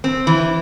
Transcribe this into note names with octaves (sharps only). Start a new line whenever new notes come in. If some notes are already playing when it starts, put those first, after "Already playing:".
C4
E3